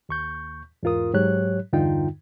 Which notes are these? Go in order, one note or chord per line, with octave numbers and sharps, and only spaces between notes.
D#2 C#6 G6
E2 G#2 F4 A#4 D#6
G#2 F#3 G4 C#5 F#6
E2 G2 D3 D#4 F4 G5